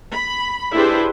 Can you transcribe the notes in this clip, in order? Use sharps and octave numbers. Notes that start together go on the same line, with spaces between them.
B5
D4 E4 G4 G#4 B4 C5